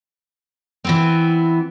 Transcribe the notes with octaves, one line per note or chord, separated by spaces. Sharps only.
E3 B3 C4